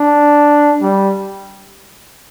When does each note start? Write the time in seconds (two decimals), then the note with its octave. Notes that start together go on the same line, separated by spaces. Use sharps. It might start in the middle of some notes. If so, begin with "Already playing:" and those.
Already playing: D4
0.82 G3